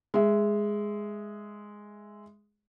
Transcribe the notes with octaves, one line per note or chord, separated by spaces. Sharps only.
G#3 E5